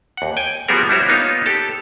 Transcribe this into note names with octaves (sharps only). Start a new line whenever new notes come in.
D#2 F#5
G5 G#5
F3 G3 B3 F#4 G#4 A#4
G3 D4 E4 F#4 C5 C#5
A#3 B3 D#4 F4 C#5
G4 A4 A5